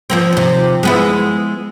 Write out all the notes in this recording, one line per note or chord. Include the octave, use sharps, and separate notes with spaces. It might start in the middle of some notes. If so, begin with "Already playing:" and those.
F3 A#3 C4
D#2 C3
G#3 B3 E4